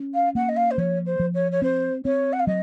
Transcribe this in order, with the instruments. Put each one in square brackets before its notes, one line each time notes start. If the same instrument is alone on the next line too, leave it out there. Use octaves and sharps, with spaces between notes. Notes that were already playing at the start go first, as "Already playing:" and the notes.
Already playing: [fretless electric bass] C#4
[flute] F5
[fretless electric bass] A#3 [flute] F#5
[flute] D#5
F5
C5
[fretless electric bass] F3 [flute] C#5
[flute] C5
[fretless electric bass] F3
[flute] C#5
C#5
[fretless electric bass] C4 [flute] C5
[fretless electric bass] C4 [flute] C#5
[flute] F#5
F5
[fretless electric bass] F#3 [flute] D#5